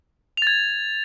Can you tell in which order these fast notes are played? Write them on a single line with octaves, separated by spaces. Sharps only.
F7 A6 G#6